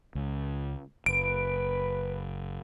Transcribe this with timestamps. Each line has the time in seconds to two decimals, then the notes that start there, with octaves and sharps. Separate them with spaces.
0.15 C#2
1.06 F#1 B4 D7